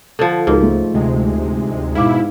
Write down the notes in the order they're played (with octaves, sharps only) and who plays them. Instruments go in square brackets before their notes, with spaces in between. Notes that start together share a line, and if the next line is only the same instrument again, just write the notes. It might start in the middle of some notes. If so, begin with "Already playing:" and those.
[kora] D3 F3
[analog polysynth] C#2 [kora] G#2 [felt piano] D#4 F#4 A#4
[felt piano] A3
[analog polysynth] D2 C3 G#3
[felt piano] G#2 F5 D6 [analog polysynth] B2 E4